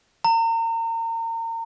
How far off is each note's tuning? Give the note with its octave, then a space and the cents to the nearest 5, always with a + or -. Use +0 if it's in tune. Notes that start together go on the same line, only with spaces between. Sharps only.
A#5 -35